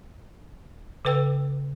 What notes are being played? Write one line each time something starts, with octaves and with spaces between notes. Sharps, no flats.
C#3 A4 B4 G5 E6